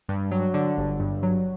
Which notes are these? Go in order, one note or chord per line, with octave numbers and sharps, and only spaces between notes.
G2
F#3
D3
G1
G2
F#3